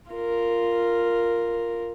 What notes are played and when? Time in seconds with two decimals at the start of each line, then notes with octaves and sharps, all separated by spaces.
0.12 F4 A#4